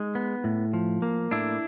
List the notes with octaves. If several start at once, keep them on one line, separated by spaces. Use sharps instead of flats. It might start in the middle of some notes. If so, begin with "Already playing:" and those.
Already playing: G#3 D#4
B3
A2
F3
A#3
A2 D4 E4